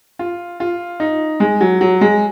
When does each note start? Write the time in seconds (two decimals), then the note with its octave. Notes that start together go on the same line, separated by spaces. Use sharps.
0.19 F4
0.60 F4
1.00 D#4
1.40 G#3
1.61 F#3
1.81 F#3
2.01 G#3